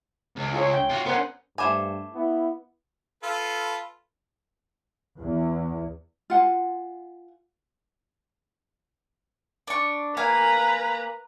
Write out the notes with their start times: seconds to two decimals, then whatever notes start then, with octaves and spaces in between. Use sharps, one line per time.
0.36 C#2
0.54 F4 G#4 C#5
0.74 G5
0.90 F4 F#4
1.06 B3 C#4 A#4 C5 F#5
1.58 G2 A3 C5 G#5 B5 D6
2.15 B3 E4
3.23 F4 A4 B4
5.20 E2
6.30 F4 F#5 G#5
9.67 D4 C#6
10.17 A#3 B4 F5 G#5 A#5